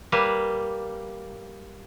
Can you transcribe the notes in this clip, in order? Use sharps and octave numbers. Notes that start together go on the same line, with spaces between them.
G3 A#3 B4